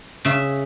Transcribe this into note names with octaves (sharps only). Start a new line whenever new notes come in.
C#3 E5